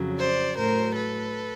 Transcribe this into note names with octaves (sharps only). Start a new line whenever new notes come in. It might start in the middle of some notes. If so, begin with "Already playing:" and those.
Already playing: F2 C#3 F#3
C5 D5
A2 F#3 A#4 C5
A4 B4